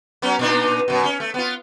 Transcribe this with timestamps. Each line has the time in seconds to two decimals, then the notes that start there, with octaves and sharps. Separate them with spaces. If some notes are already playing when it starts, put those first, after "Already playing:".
0.22 F#3 B3 C#4
0.39 A#2 D4 D#4
0.88 F#2 B2
1.04 C#4
1.20 A3
1.34 B3 F4